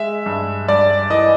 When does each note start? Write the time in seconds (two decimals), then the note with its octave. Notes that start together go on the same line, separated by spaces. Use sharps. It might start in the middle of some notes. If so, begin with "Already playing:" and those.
Already playing: G#3 E5
0.26 G2
0.68 G2 D5
1.10 E3 D#5